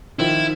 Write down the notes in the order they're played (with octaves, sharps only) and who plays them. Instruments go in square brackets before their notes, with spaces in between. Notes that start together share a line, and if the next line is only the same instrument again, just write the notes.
[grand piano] D#3 F3 [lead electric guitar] E4